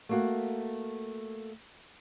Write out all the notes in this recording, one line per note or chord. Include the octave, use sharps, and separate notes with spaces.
A3 A#3 F#4